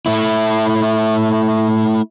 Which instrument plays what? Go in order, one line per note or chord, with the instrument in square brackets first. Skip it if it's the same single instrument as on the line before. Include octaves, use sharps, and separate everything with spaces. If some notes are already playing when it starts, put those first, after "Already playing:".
[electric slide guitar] A3 E4